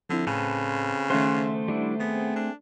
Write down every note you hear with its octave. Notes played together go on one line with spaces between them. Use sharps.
D3 F3 C4 E4
A2 C#3 C4 A4 B4
D#3 A3 C#4 C5 E5 F#5 C6 F#6
G3 D4 E4
B3 C4 G#4
D4